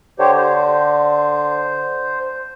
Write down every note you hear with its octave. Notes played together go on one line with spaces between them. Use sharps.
D3 G4 C5 C#5
C5